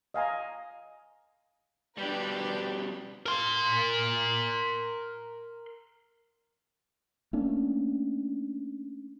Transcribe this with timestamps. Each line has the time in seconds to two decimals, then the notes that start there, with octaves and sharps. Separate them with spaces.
0.14 D#5 F5 G#5 A#5
1.98 B2 G3 D4 G4 B4
3.26 A#4 C6
7.33 A3 A#3 C#4 D4